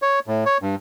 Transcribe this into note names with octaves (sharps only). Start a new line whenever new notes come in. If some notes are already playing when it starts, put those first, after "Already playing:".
C#5
A2
C#5
G2